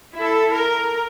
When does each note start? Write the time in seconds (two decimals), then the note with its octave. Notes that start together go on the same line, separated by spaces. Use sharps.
0.17 E4 A4
0.52 A#4